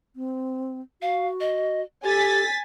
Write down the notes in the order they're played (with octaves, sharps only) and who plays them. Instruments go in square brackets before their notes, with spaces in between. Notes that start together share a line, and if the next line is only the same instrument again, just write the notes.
[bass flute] C4
[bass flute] F#4 [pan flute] F5
[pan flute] D#5
[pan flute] G4 [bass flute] A4 [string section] G#5 A6 B6